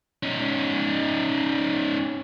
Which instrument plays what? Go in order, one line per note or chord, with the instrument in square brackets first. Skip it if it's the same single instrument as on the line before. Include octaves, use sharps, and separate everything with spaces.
[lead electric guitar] C#4 D#4